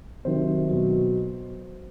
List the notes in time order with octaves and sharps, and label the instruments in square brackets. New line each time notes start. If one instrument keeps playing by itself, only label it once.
[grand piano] C3 D#3 F#3 C5
B2 F#3